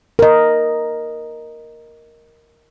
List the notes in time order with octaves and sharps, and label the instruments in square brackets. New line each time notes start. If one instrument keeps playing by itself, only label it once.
[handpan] A#4 D#5